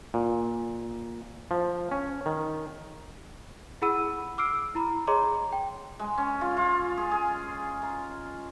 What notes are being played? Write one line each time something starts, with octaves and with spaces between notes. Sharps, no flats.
A#2
F3
C#4
D#3
E4 G#4 F#5 B5 E6 D#7
D6 E6 F6 C7 D7
E4 A#5 B5
G#4 C#5 D#5 A#5 C6 D6
G5
G#3
C#4
F4
F4
G#4
G#4
A#5